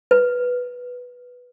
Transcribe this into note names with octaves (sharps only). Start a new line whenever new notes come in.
B4